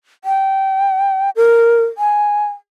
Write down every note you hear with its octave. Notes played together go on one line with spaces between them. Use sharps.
G5
A#4
G#5